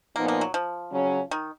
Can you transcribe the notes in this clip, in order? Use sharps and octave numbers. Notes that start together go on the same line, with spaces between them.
A#2 F3 A#3 B3 D#4
A#3
F#3
F3
C#3 F#3 C#4
D#3